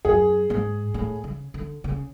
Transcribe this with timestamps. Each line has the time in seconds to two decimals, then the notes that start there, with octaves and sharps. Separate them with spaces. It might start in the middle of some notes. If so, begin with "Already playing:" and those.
0.05 F#2 G#4
0.50 G#2
0.94 A2
1.24 C#3
1.54 D3
1.84 C#3